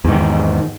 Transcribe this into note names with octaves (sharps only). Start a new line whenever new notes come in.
E2 G#2 D#3